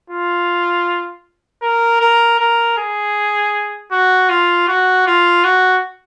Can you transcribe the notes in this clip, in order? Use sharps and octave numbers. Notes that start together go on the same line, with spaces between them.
F4
A#4
A#4
A#4
G#4
F#4
F4
F#4
F4
F#4